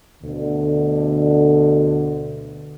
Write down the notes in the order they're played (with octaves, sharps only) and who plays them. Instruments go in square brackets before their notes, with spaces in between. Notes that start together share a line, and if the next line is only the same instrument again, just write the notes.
[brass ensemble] D2 B2 D3